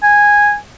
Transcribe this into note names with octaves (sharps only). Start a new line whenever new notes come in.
G#5